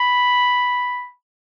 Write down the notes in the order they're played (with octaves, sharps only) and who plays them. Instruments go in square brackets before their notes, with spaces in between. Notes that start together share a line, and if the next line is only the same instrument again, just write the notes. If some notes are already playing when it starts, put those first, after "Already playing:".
Already playing: [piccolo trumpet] B5